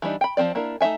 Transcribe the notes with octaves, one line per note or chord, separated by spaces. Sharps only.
E3 G3 D4 D#4
G5 B5
F3 A#3 C4 D5
A#3 D4 E4 A#4
A3 D#4 D5 E5 G#5